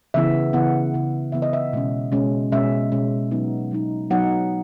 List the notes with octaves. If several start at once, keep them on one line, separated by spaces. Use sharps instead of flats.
C#3 E3 B3 E4 E5
C#3 E3 B3 E4 F#5
C#3 E3 B3 E4
C#3 E3 B3 E4 E5
D#5
E5
B2 G#3 C#4
B2 G#3 C#4
B2 G#3 C#4 E5
B2 G#3 C#4
F#3 B3 D#4
F#3 B3 D#4
F#3 B3 D#4 F#5